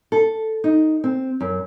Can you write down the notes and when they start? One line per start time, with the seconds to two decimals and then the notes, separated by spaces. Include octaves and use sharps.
0.12 A4
0.64 D#4
1.04 C4
1.41 F#2